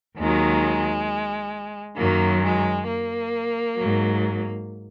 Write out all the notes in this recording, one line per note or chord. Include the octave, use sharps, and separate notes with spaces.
D#2 D#3 F#3 G#3
F#2 D#3 F#3 A#3
G#3
A#3
G#2 F#3